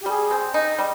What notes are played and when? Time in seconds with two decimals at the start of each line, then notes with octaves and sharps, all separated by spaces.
0.01 G4
0.06 G3 G#4
0.31 C4
0.54 D#4
0.79 G3